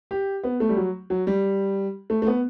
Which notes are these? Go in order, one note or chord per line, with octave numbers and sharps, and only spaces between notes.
G4
B3
A3
G3
F#3
F#3
G3
A3
A3
B3